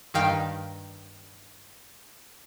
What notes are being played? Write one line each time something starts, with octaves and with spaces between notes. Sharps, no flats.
G2 D#3 F5 G5